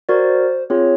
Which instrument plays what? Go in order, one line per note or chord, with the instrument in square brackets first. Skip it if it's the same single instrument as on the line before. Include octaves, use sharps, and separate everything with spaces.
[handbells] F#4 A#4 D5 [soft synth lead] C5
[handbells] C4 F4 G#4 [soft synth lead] C#5